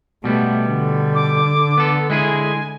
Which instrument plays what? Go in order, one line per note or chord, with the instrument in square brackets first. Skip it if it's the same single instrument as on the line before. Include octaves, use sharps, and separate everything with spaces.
[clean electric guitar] B2 G3 B3 [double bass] A3
[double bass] D3
[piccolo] D6
[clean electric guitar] B3 A4
[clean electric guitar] G#3 E4 G#4 [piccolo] G#5